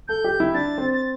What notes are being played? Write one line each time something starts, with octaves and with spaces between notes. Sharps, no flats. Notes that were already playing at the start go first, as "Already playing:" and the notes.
A4 G6
G4
E4
D4 A6
C4
A6